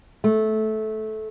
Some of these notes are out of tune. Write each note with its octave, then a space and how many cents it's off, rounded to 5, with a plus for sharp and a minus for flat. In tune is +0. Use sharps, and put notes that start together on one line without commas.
A3 -15